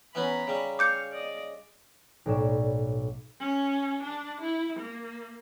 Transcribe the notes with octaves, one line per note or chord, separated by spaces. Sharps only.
E3 B3 C#4 A#5 B5
C#3 G3
F5 D6 G6 C#7
D5 D#5
B1 A2 D5 E7
C#4
D4
E4
A#3